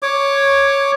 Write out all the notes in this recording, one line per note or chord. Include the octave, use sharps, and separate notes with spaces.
C#5 D6